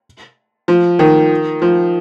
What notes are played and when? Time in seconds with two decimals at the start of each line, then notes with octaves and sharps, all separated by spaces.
0.68 F3
0.99 D#3
1.62 F3